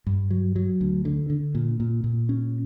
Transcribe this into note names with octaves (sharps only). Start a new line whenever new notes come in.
G2
F#3
F#3
D2
D3
D3
A#2
A#2
A#2
C#4